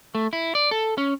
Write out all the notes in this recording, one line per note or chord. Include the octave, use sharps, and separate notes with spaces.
A3
E4
D5
A4
C#4